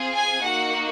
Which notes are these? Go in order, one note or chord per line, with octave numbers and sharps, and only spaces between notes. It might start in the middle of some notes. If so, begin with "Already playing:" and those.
Already playing: C4 F4 G#4
G#5
A#3 D#4 F#4 F#5